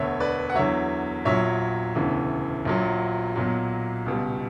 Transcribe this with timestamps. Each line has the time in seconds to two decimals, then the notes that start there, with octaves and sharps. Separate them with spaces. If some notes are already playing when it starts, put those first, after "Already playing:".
Already playing: E1 D2 D3 C#5 E5
0.20 B4 D5
0.50 F#5
0.55 E2 D3 F#3 C#5 E5
1.25 A#1 A#2 F#3 C#5 E5
1.95 E1 D2 C#3 E3
2.65 A#1 A#2 F#3
3.36 B1 A#2 F#3
4.06 C#2 B2 G3